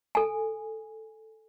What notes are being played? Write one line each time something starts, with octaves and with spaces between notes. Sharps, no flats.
A4 G#5